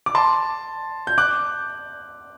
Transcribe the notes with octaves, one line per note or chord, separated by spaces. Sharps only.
D6
A5 C6
G6
D6 F#6